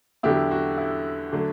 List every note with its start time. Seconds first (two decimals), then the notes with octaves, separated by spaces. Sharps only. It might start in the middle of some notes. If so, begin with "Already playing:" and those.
0.23 E2 D3 F#3 E4 G4
0.51 F#4
0.77 E4
1.33 D3 F#3 A3